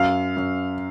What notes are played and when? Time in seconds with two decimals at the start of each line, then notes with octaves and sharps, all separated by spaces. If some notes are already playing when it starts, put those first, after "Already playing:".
Already playing: F#2 F5
0.36 F#2